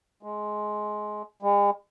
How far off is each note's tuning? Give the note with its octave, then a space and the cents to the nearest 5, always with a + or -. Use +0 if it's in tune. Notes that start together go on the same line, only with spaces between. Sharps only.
G#3 +15
G#3 -45